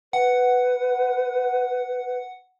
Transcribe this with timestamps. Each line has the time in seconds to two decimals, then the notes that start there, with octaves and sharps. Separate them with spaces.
0.13 B4 F#5